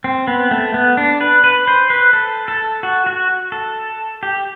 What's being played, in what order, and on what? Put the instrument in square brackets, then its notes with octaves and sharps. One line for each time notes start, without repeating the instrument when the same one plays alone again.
[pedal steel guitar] C4
B3
A3
B3
D4
B4
B4
C5
B4
A4
A4
F#4
F#4
A4
G4